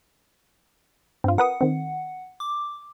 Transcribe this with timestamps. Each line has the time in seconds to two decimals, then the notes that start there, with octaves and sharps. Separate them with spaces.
1.24 G2 C4 F4
1.38 A#4 B4 F#5 D#6
1.61 D#3 C4
2.40 D6